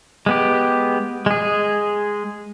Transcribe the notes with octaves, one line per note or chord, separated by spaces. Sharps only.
G#3 B3 G4
G#3 G#4